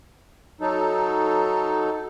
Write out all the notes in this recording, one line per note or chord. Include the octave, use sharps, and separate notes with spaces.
F#3 D#4 A4